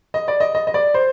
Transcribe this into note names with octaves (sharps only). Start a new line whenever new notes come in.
D#5
D5
D#5
D#5
D#5
D5
C5